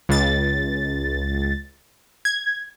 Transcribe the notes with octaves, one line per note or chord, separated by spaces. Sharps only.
C#2 A6
G#6